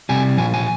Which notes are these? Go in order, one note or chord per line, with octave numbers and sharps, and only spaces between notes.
C3 G3 G#5
A#2 F3 G#5
G#5